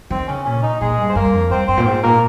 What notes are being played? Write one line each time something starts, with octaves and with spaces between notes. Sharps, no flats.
D#3 C4
C#3 C#4
A#2 C#4
D#4
A#2 G#3 G#4
G2
C5
G2 A#3 A#4
F2
G2 C4 C5
G2 C4 C5
A#2
G#2 C4 C5
A#2 A#3 A#4